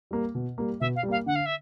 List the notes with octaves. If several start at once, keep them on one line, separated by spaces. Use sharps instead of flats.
G3 A#3
B2
G3 A#3
B2 E5
F5
G3
A#3 F5
D3 F#5
F5
E5